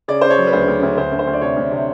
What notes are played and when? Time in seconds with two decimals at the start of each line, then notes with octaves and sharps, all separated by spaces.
0.08 C#3 D5
0.21 C#3 C5
0.30 C#5
0.38 F#3
0.47 B4
0.53 D2 C5
0.68 D2
0.82 D2
0.97 D2 C5
1.12 D2
1.19 C5
1.27 D2
1.33 D5
1.41 C3 C#5
1.56 D2
1.71 C3